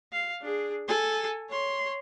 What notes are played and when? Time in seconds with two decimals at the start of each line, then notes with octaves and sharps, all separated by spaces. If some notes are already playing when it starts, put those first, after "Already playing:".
0.12 F5
0.42 D4 G#4
0.88 A4 G#5
1.49 C#5 C6